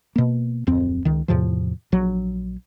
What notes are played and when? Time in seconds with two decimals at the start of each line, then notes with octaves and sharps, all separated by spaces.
0.16 B2 A#3
0.67 D1 F2 C4
1.05 C#2 D#3
1.28 E2 A2 C3 F3
1.92 A#1 F#3